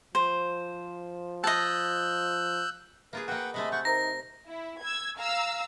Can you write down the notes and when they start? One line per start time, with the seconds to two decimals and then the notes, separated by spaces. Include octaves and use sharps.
0.15 F3 C5
1.44 D#5 A5 E6 F#6 G6
3.13 A#3 F4 G#4 B4
3.28 A#3 F#4 B4 F#5 G5
3.54 C3 G#3 A3 D#5 B5
3.72 A3 F#5 C#6 G6
3.85 D#4 A#4 C5 A#5 A#6
4.48 E4
4.82 E6 G#6
5.19 F5 A#5 E6